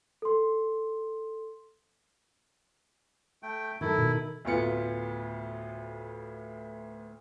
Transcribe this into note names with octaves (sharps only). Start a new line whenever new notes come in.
A4 C6
A3 G5
D#3 E4 A4
B2
D2 A2 B3 F4 C#7